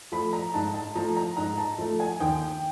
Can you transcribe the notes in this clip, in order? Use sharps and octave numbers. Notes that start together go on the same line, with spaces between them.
F3 A3 B5
A#5
G#2 A5
A5
F3 A3 A#5
A#5
G#2 A#5
A5
F3 A3
G#5
D#2 G5